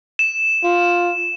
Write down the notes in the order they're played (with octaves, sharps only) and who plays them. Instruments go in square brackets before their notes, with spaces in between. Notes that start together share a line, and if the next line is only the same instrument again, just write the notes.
[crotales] E7
[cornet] F4